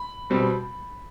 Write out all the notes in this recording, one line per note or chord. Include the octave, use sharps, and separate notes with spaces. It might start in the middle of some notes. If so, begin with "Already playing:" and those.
Already playing: B5
B2 G3 C4